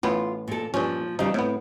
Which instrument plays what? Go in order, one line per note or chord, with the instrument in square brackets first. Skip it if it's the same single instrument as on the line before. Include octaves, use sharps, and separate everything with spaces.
[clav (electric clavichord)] A1 A2 B3 [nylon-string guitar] F4
[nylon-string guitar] A#2 A4
[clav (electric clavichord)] G2 C#4 [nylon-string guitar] A#2 F3
[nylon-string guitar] E2 C#3 G3 [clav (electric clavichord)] F3 D#4
[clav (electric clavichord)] A2 B3 [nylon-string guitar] C4